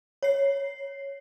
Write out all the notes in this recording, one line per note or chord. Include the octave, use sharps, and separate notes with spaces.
C#5 C7